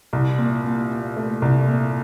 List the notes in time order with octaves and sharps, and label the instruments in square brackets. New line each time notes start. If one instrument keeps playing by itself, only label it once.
[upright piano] C2
A#2
A#2
A#2
A3
C2
A#2